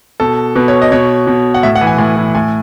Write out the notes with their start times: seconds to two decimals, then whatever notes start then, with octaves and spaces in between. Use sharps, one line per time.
0.20 B2 A4
0.56 B2 B4
0.68 C#5
0.82 D#5
0.92 B2 C#5
1.27 B2
1.54 F#5
1.63 A2 E5
1.75 F#5
1.81 E3
1.87 G#5
1.98 A2
2.16 E3
2.35 A2 G#5